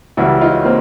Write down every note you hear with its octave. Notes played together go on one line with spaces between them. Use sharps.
C#2 C#3 E3 G3 E4 F#4
D#4 F4
A#3 C4